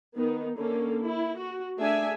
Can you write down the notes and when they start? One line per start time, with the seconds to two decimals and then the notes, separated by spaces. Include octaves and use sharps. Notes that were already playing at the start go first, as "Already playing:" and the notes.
0.17 D#3 B3 D#4
0.57 D3 A#3 C#4 A4
1.03 E4
1.38 F#4
1.79 A3 D4 G#4 E5 G#5